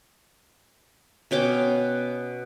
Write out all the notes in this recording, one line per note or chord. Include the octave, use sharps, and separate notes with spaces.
B2 C#4 G5 D6